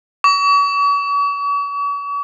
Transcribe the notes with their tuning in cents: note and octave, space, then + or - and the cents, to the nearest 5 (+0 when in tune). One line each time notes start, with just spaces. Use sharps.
C#6 +45